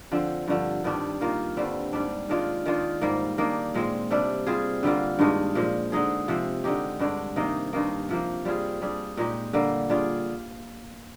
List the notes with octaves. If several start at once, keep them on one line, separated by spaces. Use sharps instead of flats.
D3 F3 C4
G2 D3 F3
G2 D#3 G3 D4
D#3 A#3 F4
G2 D3 G3 C4
G#2 G3 D4
D#3 G#3 D4 F4
D#3 G#3 D4 F4
G#2 G3 A#3
D#3 A#3 D4
A#2 G#3 C4
C3 G3 D4
G3 C4 F4 G#4
D3 G3 A#3 F4
G2 D#3 G#3 D4
A#2 F3 G#3
D3 G#3 D#4 G#4
C3 F3 C4
D3 G#3 D#4 G4
G2 D3 G#3 D4
C3 D#3 A#3 D#4
G2 D#3 A#3
C3 F3 A#3
G3 C4 F4 G#4
G3 D4 G#4
A#2 G#3 D#4 G4
D3 G3 A#3
G3 D4 F4 G#4